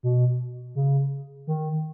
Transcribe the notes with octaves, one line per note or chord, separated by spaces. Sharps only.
B2
C#3
D#3